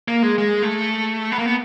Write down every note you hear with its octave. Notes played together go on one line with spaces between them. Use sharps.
A#3
G#3
G#3
A3
B3
A#3
B3